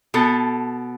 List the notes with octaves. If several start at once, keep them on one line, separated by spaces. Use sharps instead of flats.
B2 B3 A4